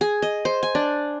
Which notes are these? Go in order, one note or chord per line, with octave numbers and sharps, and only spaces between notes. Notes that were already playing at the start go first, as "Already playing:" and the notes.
G#4
D#5
C5
G#5
D4